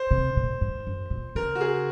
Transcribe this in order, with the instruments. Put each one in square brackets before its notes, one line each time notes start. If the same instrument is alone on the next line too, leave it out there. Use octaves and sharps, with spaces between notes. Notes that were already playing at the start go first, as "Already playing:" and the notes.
Already playing: [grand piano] C5
[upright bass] C3
A#2
G#2
F#2
A#2
[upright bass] C#3 [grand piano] A#4
[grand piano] F#4
G#4